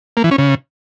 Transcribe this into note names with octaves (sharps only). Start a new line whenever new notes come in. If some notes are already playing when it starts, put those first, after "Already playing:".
A#3
E3
C#4
C#3